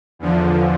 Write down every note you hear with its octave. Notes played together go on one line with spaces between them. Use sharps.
E2 D3 F3